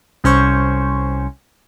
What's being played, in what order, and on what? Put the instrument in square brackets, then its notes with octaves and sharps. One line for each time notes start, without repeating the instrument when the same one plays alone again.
[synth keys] C2 C#4 C5 C#6